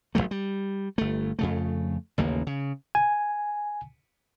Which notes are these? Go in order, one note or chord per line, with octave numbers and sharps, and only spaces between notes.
G#1 D#2 F#3 A3
G3
G1 A3
F2 C#3 A3
A1 D#2 C#3 A#3
C#3
G#5